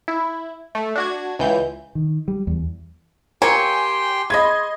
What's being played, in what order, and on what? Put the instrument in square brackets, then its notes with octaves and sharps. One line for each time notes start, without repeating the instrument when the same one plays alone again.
[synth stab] E4
A3
D4 F#4 G#6
C#2 E3 G6
[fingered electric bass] D#3
G3
E2
[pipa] F#3 A#3 C#5 [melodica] G4 G5 C6 [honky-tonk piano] G#5
[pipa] G#4 B5 [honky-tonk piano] D#5 C6 G#6